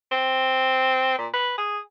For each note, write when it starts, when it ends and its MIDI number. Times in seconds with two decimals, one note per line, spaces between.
0.11 1.15 60
1.18 1.28 46
1.33 1.54 71
1.58 1.78 68